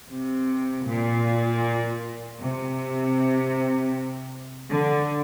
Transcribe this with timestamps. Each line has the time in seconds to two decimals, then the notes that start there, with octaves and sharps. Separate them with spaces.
0.10 C3
0.86 A#2
2.40 C3
4.70 D3